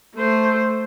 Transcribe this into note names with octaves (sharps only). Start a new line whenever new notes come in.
A3 C5